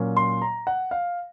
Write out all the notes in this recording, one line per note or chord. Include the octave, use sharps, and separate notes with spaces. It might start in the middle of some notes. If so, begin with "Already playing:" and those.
Already playing: A#2 F#3 A#3 C#4
C6
A#5
F#5
F5